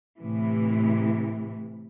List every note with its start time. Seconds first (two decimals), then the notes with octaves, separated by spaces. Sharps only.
0.17 A2 C3 E3